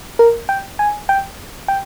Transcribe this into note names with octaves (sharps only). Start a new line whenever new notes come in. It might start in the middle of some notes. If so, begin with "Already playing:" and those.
A#4
G5
G#5
G5
G5